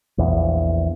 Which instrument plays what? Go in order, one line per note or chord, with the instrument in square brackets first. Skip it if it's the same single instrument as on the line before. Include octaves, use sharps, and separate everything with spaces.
[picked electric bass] A#1 E2